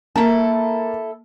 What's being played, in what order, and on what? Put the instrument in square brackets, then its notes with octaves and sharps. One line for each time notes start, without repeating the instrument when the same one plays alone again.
[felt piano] A#3 [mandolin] E4 A4